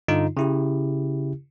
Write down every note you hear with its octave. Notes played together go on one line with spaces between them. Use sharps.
G2 D3 D#4 F4
C#3 E4 G4